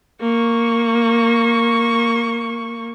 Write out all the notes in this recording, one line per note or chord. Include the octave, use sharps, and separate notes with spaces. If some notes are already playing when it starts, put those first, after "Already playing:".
A#3 C#6